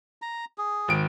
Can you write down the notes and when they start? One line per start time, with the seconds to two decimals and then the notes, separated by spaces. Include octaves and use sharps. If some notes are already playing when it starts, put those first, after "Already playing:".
0.22 A#5
0.58 G#4
0.88 G#1 D7